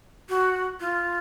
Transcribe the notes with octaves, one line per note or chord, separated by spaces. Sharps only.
F#4
F4